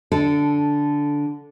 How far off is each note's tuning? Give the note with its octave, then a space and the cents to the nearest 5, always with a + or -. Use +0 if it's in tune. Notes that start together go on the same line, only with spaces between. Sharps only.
D3 -10 A4 +0